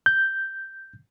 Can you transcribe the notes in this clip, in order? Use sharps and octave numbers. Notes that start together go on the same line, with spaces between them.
G6